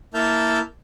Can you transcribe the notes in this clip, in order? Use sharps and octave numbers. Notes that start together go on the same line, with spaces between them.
A#3 E4 E5 A5 F6 G6